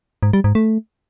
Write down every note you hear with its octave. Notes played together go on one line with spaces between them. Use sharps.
G#2
G3
G#2
A3